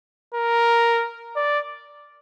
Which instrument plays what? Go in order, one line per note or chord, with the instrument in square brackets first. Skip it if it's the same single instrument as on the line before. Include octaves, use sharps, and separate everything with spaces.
[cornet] A#4
D5